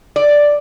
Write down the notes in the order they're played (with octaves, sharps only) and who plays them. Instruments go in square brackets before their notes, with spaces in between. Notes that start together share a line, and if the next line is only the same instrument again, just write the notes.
[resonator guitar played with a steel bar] D5